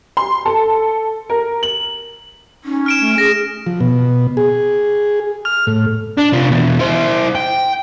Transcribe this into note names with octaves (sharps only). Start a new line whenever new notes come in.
C6
A4
A#4
F#7
C#4 D#4
F6 D7 E7
A3
G#4 A#6
F3
B2
G#4
F6
A2
D4
C3 F4
B2 E3
E4 C5
G5